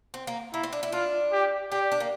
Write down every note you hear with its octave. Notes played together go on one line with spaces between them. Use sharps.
C4
A#3
A#3 E4
C4
D4
E4
D4 F4
G4
D4 G4
D4
A#3